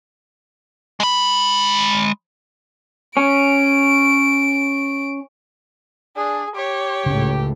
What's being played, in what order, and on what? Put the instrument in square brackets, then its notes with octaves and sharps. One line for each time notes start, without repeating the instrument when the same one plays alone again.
[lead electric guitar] G#3 B5
[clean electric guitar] C#4 [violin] D7
[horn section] D4 [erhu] G#4
[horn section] G4 [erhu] C#5
[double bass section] C#2 A2 [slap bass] C#3 C#4